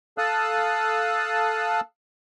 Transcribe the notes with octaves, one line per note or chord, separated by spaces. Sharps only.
A4 F5 A5 D#6 E6 F#6